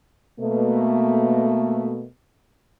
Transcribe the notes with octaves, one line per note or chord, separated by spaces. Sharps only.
B2 A3 A#3